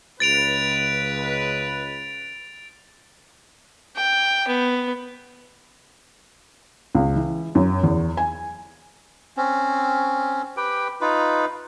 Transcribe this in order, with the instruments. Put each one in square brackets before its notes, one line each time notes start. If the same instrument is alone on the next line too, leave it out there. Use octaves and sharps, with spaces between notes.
[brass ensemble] C#2 B4 [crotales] A6 D7 F7
[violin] G5
B3
[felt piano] C#2
E3
F#2
E2
G#5
[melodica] C4 C#4
G4 B4 G5
D#4 F4 B4